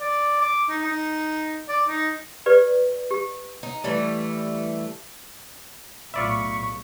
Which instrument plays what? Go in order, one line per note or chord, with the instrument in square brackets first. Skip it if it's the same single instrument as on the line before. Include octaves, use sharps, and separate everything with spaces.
[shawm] D5
D6
D#4
D#4
D5
D#4
[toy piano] G4 B4 D5
G4
[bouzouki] D#4
E3 G3 A3
[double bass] B1 A2 [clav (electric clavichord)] F4 D5 E5 [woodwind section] B5 C#6